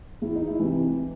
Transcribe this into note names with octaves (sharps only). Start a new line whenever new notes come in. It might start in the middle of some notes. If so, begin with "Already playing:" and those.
E2 E4
D#4
E4
C3 E3